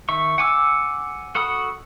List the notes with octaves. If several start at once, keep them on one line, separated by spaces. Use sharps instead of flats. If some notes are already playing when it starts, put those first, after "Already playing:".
D#3 E5 C#6
F#5 G#5 D6 E6
F#4 A4 F#5 B5 D#6